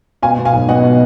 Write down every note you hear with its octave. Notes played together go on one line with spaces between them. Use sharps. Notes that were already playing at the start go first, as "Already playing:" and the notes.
B2 F5 G#5
B2
F5 G#5
B1
B2 D#5 F#5
B2